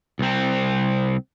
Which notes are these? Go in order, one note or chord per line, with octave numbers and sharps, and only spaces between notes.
C2 C4